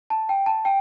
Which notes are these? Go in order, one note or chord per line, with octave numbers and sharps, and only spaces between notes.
A5
G5
A5
G5